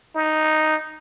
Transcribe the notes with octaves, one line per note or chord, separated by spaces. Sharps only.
D#4